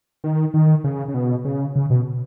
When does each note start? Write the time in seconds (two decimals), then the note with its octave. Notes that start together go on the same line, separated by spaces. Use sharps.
0.24 D#3
0.54 D#3
0.84 C#3
1.08 C#3
1.14 B2
1.45 C#3
1.76 C#3
1.90 B2